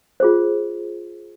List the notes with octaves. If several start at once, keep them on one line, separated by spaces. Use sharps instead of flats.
F4 G#4 C5